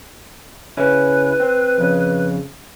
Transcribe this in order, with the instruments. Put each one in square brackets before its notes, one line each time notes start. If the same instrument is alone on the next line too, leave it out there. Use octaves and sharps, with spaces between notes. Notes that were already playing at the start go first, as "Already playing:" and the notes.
[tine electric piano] C#3 C#4 E4 [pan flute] B4
[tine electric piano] C4
F2 C#3